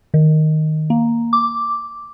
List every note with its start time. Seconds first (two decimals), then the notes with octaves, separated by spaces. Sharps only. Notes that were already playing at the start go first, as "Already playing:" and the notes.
0.14 D#3
0.90 A#3
1.33 D6